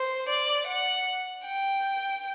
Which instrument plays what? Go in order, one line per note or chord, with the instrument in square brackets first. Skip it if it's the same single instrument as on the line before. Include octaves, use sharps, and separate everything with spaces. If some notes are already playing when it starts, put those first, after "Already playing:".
Already playing: [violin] C5
D5
F#5
G5